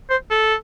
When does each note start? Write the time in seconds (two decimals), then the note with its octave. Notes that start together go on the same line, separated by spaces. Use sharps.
0.10 C5
0.31 A4